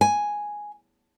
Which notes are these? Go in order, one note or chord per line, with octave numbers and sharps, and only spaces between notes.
G#5